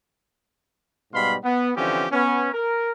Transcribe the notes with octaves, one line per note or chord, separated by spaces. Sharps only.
G#2 B2 G3 F5 B5 C6
B3
D3 E3 F3 C4 C#4 G4
B3 C#4
A#4